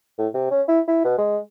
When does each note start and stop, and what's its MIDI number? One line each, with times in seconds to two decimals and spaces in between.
0.19 0.28 45
0.34 0.49 48
0.51 0.62 61
0.68 0.80 64
0.88 1.03 64
1.05 1.17 47
1.18 1.38 56